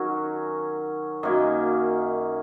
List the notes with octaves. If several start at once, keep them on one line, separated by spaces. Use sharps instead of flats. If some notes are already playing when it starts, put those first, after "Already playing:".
Already playing: D#3 F#3 C#4 F#4
F#2 D#3 A#3